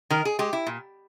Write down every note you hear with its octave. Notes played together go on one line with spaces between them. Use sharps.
D#3 A#4
G#4
G#3 G4
E4
A#2